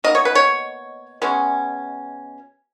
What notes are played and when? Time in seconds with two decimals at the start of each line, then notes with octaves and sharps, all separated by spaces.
0.04 B2 A#3 D#4 D#5
0.15 C#5
0.25 B4
0.35 C#5
1.22 B2 G#3 C#4